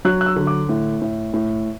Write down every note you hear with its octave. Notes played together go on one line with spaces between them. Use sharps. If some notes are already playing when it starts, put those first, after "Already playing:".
F#3 F#6
F#6
E6
D3
D6
A2
A2
A2